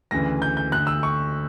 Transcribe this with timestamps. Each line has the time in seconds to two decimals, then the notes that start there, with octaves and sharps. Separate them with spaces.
0.11 D2 C#3 E3 A#6
0.42 G6
0.57 G6
0.72 D2 D3 F#6
0.87 E6
1.03 C#6